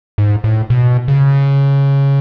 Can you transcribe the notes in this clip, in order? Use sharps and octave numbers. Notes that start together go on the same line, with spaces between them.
G#2
A2
B2
C#3